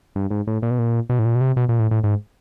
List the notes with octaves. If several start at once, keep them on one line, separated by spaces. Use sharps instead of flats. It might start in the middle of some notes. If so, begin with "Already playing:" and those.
G2
G#2
A2
A#2
B2
A#2
B2
A2
A#2
B2
C3
B2
A#2
A2
A2
G#2